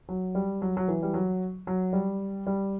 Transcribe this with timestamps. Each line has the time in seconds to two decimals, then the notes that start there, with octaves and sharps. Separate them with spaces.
0.09 F#3
0.35 G3
0.62 F#3
0.77 F#3
0.88 E3
1.03 G3
1.14 F#3
1.67 F#3
1.93 G3
2.47 G3